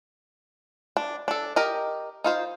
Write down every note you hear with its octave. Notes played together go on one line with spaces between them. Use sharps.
D4
D4 A4
G4 A#4 D#5
D#4 F4 C5